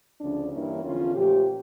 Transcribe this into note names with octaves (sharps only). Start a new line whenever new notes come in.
D2 C#3 F3 C#4 D4
G2 E3 A#3 C#4 E4
E2 D3 F3 C#4 F4
A#2 F3 A3 C#4 G4